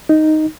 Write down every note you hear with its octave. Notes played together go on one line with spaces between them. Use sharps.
D#4